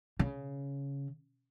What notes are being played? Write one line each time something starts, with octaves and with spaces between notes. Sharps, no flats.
C#3